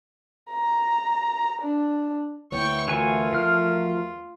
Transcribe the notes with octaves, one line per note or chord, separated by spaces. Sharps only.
A#5
D4
D2 B3 E4 C#5 G5 C#6
E3 A3 F4 F#4 A#4 G#5 C#6
E2 F3 F6